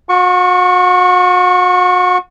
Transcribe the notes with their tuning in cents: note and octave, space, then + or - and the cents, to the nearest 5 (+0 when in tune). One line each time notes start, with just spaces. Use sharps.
F#4 -40 C#6 +5